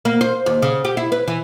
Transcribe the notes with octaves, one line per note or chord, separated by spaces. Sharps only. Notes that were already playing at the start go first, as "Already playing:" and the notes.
A#3
C5
D#2
C#3
G4
E4
B4
E3